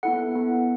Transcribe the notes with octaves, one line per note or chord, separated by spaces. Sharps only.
B3 E4 A4 F#5
B3 E4 A4